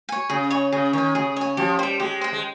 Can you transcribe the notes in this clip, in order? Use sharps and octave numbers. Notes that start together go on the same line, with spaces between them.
C#5 G#5
C#3 G#4
C#5 G#5
C#3 G#4
D#3 C#5 G#5
C#3 G#4
C#5 G#5
F3 G4
G3 C5 G5
G#3 G4
C5 G5
G#3